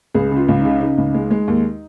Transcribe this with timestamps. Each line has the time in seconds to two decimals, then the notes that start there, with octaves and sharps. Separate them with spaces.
0.14 C#2 G#4
0.31 C#3
0.37 F4
0.48 C#2
0.59 D#4
0.65 C#3
0.81 C#3 D#4
0.98 C#2
1.14 G#3
1.31 G#3
1.48 D#2